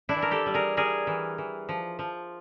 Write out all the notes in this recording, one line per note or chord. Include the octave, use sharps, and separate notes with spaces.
D4 E4
E3
A#4
G4 A4
G3
G#4 A#4
G3 G#4 A#4
E3
E3
F3
F3